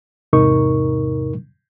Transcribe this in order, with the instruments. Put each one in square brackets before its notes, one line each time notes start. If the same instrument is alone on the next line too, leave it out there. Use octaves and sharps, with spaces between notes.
[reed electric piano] E2 G#2 C3 D#4 A#4 C#6